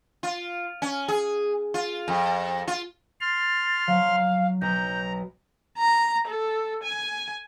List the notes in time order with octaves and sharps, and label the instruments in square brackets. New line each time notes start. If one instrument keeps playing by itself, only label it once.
[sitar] F4
C#4
G#4
F4
F2
F4
[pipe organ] C6 F6 [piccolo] A6
[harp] F#3 [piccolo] F5
[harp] B1 [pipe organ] A#5 [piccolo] G6
[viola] A#5
A4
G#5